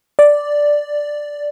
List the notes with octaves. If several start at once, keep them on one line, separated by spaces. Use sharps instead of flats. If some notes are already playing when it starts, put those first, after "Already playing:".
D5